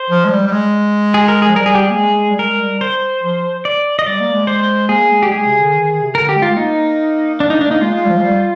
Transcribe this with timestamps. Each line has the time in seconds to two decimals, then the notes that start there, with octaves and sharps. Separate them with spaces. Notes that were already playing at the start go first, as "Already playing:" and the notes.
Already playing: C5
0.10 F3
0.25 G#3
0.31 G3
0.47 G3
0.52 G#3
1.14 G#4
1.28 A#4
1.42 G#4
1.48 F3
1.56 G3 A#4
1.66 G#4
1.75 G4
1.84 G#4
1.91 A#3
1.98 G#3
2.30 G3
2.39 G#3 A#4
2.60 G3
2.81 C5
3.23 F3
3.65 D5
3.99 D#5
4.06 G3 D5
4.20 A#3
4.34 G#3
4.47 C5
4.89 A#3 G#4
5.11 G#3
5.22 G4
5.27 G3
5.31 G#3 G#4
5.46 C3
5.59 D3
5.73 D#3
5.87 D#3
6.01 C3
6.15 D3 A#4
6.29 G4
6.36 G#3
6.42 F4
6.52 G#3
6.56 A#3 D#4
7.40 D4
7.50 D#4
7.61 D4
7.68 A#3 D#4
7.81 G#3 F4
7.95 G#3
8.04 G3
8.09 F3
8.18 G#3
8.23 G3